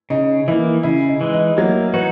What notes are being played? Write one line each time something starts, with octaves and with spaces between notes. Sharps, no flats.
C#3 D#4
E3 A#3 E4
C#3 E4
D#4
E3 G#3
D#4
F#3 A#3
E3 D#4 F#4